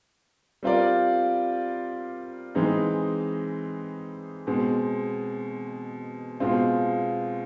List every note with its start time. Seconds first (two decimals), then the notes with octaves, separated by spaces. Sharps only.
0.63 G3 C4 F4 A#4 D5
2.55 E3 G#3 C4 D#4
4.47 B2 G#3 C4
6.40 B2 G#3 C4 F4